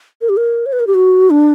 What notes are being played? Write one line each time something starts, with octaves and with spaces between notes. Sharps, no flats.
A#4
G4
A#4
C#5
B4
A#4
G4
F#4
D4